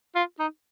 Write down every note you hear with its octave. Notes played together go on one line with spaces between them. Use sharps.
F4
D#4